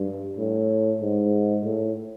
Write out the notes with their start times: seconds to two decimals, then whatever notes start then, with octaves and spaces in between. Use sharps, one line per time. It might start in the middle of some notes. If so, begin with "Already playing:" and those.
Already playing: G2
0.37 A2
1.00 G#2
1.63 A2